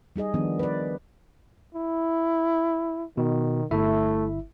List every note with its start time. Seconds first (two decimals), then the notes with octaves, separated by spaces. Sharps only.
0.16 G3 D#4 G#4 D#5
0.34 D#3 F3 B3 D4
0.59 B4 D5
1.75 E4
3.17 B2 D#3
3.71 G1 A3 E4 E5